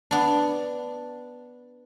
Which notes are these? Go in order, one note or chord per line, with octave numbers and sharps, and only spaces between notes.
B3 D4